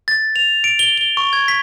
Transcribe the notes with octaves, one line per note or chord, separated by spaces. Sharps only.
A6
F7
D7
G7
G7
C#6
G#6
B6